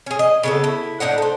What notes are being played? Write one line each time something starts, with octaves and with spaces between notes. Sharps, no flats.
C#4 G#4
D#5
C#3 B3 A4
E4
A2 D4 D#4 F#5
A4 C5